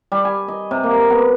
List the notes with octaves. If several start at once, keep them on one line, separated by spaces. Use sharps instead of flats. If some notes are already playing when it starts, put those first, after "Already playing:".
G3
G#5
D#5
C3
A#3
B3